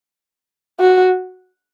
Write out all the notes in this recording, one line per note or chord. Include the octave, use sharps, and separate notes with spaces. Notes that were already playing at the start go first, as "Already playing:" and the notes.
F#4